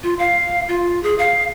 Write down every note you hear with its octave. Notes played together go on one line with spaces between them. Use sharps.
F4
F5
F4
G#4
F5